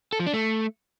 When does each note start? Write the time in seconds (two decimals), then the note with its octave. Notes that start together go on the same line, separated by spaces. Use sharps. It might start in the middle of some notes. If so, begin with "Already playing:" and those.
0.13 A4
0.20 F3
0.27 D4
0.34 A3